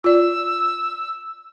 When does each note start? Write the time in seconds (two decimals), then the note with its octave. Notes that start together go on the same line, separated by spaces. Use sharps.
0.04 F4 D5 E6